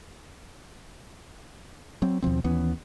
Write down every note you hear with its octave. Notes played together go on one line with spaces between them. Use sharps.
F#3 C4
D#2 B2 F3 C4
D#2 E3 B3 C#4